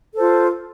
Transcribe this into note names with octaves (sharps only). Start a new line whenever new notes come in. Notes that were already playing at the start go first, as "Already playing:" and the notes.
F4 A4 C5